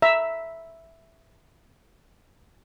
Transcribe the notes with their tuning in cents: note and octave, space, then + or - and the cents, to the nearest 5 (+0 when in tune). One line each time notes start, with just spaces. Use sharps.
E5 +0 A#5 +0